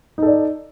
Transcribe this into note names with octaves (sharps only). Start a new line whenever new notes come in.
D#4 A4 D5